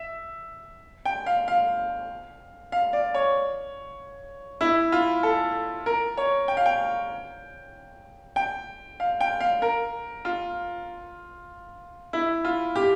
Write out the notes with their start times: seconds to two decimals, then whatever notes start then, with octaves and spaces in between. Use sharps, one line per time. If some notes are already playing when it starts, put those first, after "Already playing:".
Already playing: E5
1.05 G5
1.26 F5
1.48 F5
2.72 F5
2.93 D5
3.15 C#5
4.61 E4
4.92 F4
5.23 A4
5.86 A#4
6.17 C#5
6.48 G5
6.57 F5
6.66 G5
8.36 G5
9.00 F5
9.21 G5
9.41 F5
9.62 A#4
10.25 F4
12.13 E4
12.45 F4
12.76 G4